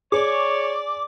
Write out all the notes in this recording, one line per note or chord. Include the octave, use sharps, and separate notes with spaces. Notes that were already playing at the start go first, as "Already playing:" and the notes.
G#4 C#5 D5 D6